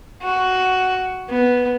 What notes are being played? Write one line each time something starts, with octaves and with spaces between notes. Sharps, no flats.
F#4
B3